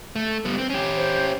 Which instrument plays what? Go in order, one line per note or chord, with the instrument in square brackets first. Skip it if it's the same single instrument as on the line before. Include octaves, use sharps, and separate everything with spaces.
[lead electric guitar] A3
G3 B3
C4
C#4 G4
[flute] C5